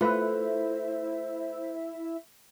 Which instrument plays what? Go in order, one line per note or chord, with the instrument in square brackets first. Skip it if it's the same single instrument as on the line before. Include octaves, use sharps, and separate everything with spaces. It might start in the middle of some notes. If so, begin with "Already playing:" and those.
[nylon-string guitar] A3 [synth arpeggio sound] E4 E5 [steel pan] F4 B4 [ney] C5